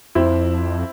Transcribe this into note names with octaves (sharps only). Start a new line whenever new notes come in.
F2 C4 E4